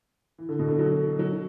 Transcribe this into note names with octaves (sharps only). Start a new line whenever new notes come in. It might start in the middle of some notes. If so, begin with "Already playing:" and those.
E3
D3
B2
D3
F#3
F#3